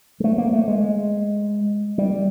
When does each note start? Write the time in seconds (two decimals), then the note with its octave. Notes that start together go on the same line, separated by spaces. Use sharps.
0.20 G#3
0.24 A3
0.38 A#3
0.53 A3
0.68 G#3
1.98 G3